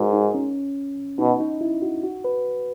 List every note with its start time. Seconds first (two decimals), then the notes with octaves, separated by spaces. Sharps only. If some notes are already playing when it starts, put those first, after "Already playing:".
Already playing: G#2 F#4 G#4 A#4
0.13 D#4
0.34 C#4
1.19 B2 D#4
1.40 D#4
1.61 E4
1.82 F#4
2.03 F#4
2.24 B4